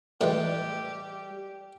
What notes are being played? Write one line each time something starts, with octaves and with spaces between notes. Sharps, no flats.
A2 E3 G3 G#3 G4